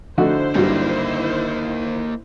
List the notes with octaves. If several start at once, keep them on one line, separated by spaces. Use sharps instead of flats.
D3 A3 D#4 E4 F#4 C5
G2 F#3 G3 A#3 D#4